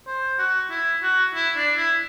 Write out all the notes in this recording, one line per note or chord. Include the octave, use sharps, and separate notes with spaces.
C5
F#4
E4
F#4
E4
D4
E4